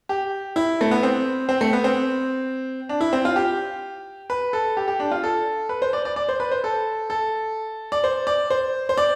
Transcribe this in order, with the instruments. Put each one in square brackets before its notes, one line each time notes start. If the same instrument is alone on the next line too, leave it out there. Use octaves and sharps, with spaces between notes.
[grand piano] G4
E4
A3
B3
C4
C4
A3
B3
C4
D4
E4
C4
F4
G4
B4
A4
G4
G4
D4
F4
A4
B4
C5
D5
D5
D5
C5
B4
C5
A4
A4
D5
C5
D5
C5
C5
D5